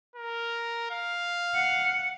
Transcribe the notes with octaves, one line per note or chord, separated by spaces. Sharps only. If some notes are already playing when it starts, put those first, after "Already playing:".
A#4
F5
F#5